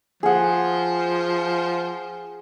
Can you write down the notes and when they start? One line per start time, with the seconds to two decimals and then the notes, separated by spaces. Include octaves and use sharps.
0.23 F3 G#4 F#5